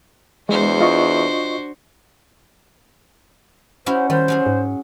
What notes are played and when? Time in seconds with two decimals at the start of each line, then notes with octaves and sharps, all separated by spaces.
0.49 E2 G#3 D4 F#4 C5
0.81 F4 D#5 C#6
3.86 C#4 E4 F#4 C5
4.10 D#3 G3 C5
4.28 F#3 C#4 G#4
4.46 G#2